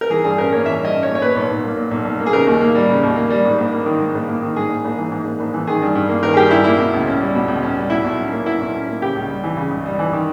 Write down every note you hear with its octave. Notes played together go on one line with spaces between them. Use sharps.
A#4
E3 G#4
G2 G#4
C#4 A#4
A#3 C#5
E3 E5
G2 D#5
C#4
C#5
A#3
C#5
A#2 B4
B1
B1
A#3
A#2
B1
B1
A#3
G#4
C#3 A#4
D#2
A#3
G3
C#3
D#2
A#3
G3
G#2
A#1
A#3
D#3
G#2
A#1
A#3
D#3
G#2 G#4
A#1
A#1
E3
G#2
A#1
A#1
E3
D#3 G#4
G2
G2
A#3
D#3 A#4
G#4
G2 G4
G2 E4
A#3 E4
B2
C#2
C#4
G3
B2
C#2
C#4
G3
B2 E4
B1
C#4
A#3
B2 E4
B1
C#4
A#3
C#3 G4
C#2
G3
E3
C#3
C#2
G3
E3
D#3